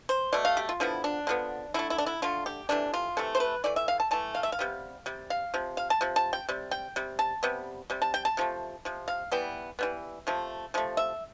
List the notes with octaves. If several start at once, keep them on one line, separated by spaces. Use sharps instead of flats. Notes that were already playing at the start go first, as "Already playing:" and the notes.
C5
B2 A3 D5
F5
G4
F4
D3 F3 B3 E4
D4
D3 F3 B3
D3 A3 E4
E4
D4
E4
D3 A3 F4
G4
C3 E3 A3 D4
F4
C3 E3 A3 A4
C5
B4
E3 A3 D5
E5
F5
A5
E3 A3 A5
F5
E5
F5
C3 G3 B3
C3 G3
F5
C3 F3
F5
A5
C3 F3
A5
G5
C3 G3
G5
C3 G3
A5
C3 G3 B3
C3 G3
A5
G5
A5
C3 F3 A3
C3 F3
F5
E3 G3 B3 G5
E3 G3 B3
C3 F3 A3
C3 F3 A3
E5